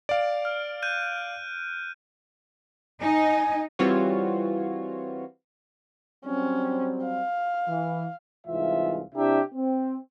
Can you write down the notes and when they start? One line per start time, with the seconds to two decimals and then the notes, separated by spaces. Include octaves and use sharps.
0.09 D5 F5 D7
0.45 F6
0.82 F#6 G6 D#7
3.02 D#4 G#5
3.79 E3 G3 C4 F4 F#4 C#5
6.25 F#3 G3 C4 C#4
7.04 F5
7.68 E3
8.47 C2 G#2 E3 F4 E5 F5
9.15 C3 D4 E4 G4 E5 A#5
9.54 C4